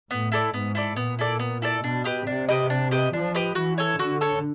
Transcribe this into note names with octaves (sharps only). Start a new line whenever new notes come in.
A2 B3
E4 A4 D5
G#2 B3
E4 A4 D5
A#2 B3
E4 A4 D5
B3
E4 A4 D5
B2 D4
G4 B4 D#5
C3 D4
G4 B4 D#5
D4
G4 B4 D#5
F3 D4
G4 B4 D#5
E3 F#4
A4 C#5
D3 F#4
A4 C#5